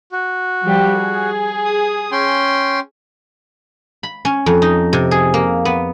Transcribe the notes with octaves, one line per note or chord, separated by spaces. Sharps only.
F#4
F3 G3 G4
G#4
D#6
C#4 G5 C6
B5
C#4
F2
D#4
C3
G#4
A#3
B3